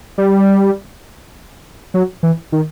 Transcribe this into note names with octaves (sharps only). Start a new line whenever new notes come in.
G3
F#3
E3
D#3